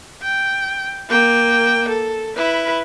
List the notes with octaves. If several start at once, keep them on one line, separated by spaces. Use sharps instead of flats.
G5
A#3 G5
A4
E4 B4